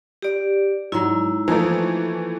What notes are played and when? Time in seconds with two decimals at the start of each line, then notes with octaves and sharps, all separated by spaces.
0.22 G4 D5
0.92 G#2 F#3 E4
1.48 E3 F3 A3 A#3 D#4